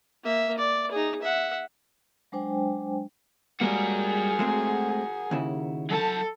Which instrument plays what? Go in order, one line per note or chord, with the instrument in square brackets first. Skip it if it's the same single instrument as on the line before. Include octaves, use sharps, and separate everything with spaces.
[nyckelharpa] A#3 E5
D5
D#4 G#4
E5 F#5
[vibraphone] F#3 G#3 D4 C5 G5 G#5
[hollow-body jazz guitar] G3 G#3 A#3 [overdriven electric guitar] F#4 A#4 [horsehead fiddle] G#4
[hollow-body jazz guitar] G#3 A3 C4
D#2 C#3 E4
[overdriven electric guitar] F#3 A5 [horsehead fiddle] A4